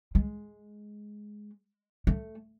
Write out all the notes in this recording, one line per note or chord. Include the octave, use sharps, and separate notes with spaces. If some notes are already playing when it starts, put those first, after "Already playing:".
G#3
A3